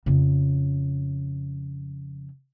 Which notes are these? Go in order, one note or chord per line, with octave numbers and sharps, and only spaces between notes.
F2 C#3